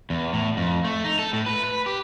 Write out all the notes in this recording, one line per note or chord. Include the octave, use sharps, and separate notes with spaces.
E2
A2
F2
A3
D#4
A4
A2
B4
B4
G4